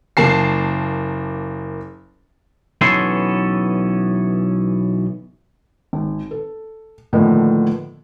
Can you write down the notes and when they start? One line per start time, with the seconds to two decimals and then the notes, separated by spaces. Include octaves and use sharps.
0.17 F#1 A#3 A5 C7
2.81 B1 E3 B3 C#4 A4 C6
5.93 G#1
6.31 A4
7.13 A2 D3 D#3 F3 A#3 B3